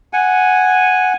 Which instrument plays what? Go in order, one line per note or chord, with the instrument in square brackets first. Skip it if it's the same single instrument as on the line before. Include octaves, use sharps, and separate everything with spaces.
[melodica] F#5 G#5